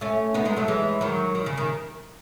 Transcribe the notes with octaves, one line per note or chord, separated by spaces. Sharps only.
A3 C#4
B3 D#4
G#3 B3
F#3 A3
E3 G#3
D#3 F#3
D#3
C#3
D#3